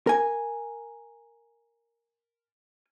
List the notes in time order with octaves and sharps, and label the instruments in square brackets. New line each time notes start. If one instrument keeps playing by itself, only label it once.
[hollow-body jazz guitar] A#4 G#5